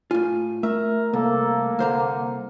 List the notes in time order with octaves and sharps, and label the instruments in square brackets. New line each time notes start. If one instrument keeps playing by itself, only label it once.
[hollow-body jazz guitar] A2 F4 [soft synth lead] G#5
[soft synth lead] A3 [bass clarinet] A#4 [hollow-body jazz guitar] E5
[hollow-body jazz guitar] C2 [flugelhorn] A#3 [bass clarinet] A4
[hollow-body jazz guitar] C2 C5 A#5 [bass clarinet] D3 [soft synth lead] F6